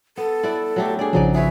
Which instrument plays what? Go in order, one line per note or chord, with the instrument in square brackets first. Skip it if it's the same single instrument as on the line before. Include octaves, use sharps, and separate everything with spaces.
[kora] B3 [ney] A4
[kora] E4 B4 D5
F#3 A3 G4
[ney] D4 [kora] G#4 D5
[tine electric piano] A#1 C#3 F3 [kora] F#3 D#4 D5
[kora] G#4 B4 C#5 [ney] E5